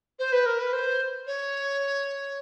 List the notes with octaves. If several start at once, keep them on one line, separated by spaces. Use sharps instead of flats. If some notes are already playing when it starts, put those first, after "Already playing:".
C5
B4
A#4
B4
C5
C#5